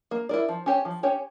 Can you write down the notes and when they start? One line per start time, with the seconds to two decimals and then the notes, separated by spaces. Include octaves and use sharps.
0.11 A#3
0.29 E4 A#4 D5
0.49 F3
0.66 C#4 G4 C#5
0.85 F3
1.03 C#4 G4 C#5